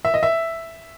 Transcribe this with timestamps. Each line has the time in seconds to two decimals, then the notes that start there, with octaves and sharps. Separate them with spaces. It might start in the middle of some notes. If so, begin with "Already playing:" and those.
0.05 E5
0.14 D#5
0.23 E5